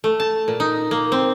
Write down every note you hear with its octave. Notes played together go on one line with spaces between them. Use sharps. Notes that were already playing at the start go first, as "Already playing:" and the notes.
A3
A5
A#2
D#4
A#3
C4